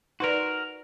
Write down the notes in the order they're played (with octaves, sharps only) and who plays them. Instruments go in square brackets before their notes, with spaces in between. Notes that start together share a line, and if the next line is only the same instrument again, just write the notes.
[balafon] D#4 B4 D5 [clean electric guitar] F#4 A#4